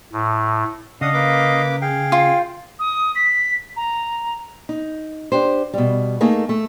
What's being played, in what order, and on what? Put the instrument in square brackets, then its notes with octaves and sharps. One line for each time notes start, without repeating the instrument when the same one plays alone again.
[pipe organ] A2
[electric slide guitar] C#3 [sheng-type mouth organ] D4 F#5 D#6 [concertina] D#5 F5
[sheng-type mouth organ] A#3 B4 D6
[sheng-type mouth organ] G#4 [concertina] F5 G5
[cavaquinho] F4
[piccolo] D#6
B6
A#5
[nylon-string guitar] D#4
D4 G4 C5
B2 G3
A3 A#3 D#4 G#4
A3